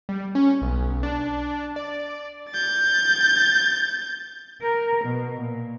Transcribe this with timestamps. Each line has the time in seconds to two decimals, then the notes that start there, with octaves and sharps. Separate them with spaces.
0.09 G3
0.35 C#4
0.62 B1
1.03 D4
1.76 D5
2.50 G6 A6
4.61 A#4
5.06 B2
5.40 A#2